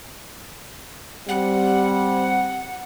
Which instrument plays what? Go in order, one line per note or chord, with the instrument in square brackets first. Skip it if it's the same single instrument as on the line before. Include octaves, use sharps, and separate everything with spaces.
[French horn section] G3 C4 [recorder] F#5